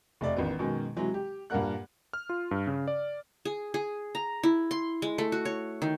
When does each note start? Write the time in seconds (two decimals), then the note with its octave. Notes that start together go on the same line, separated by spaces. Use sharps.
0.21 F1 A3 D5
0.37 A1 D#3 B3
0.59 F#2 B2 D#3 G#3
0.96 C3 E3 F#3 G#3
1.14 G4
1.50 G2 A#2 A#3 A#4 F#5 F#6
2.13 F6
2.29 F4
2.51 G2
2.67 C#3
2.88 D5
3.45 G#4
3.74 G#4
4.15 A#5
4.43 E4
4.71 C6
5.02 G#3
5.18 A3
5.32 F#4
5.45 C#5
5.82 D#3